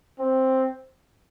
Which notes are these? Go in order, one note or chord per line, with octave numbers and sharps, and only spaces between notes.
C4